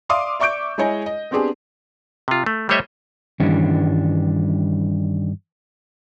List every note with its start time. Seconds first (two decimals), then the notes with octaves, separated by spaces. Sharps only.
0.09 D5 E5 F5 C6 D6 D#6
0.40 D5 E5 C#6 D6 G6 D7
0.78 G#3 E4 G#4 C#5 D#5 G#5
1.06 D#5
1.31 B3 C4 D4 G4 G#4
2.28 C3 F4
2.46 A3
2.69 G3 A3 C5 C#5 D#5 E5
3.40 G2 D#3 E3 G3 C#4 D4